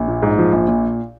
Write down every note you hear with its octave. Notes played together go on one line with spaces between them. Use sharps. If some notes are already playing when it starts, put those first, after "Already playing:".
Already playing: A#1
A#2
G#2
F3
A#1
A#2